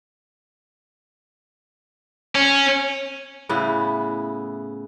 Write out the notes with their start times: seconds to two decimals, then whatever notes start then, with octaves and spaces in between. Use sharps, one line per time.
2.35 C#4
3.49 A2 C#3 B3 E4